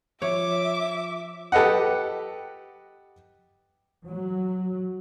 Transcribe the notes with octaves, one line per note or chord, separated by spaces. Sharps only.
F3 C#5 E5 D6
G4 A4 B4 D#5 F#5
F#3